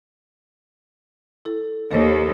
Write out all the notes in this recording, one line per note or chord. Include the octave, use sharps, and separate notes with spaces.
E4 A4
D#2 A4 C5 C#5